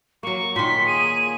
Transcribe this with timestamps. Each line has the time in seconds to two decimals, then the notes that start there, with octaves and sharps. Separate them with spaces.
0.23 F#3 A#3 C#6
0.56 A#2 D#3 C6 B6
0.87 G#4 D#7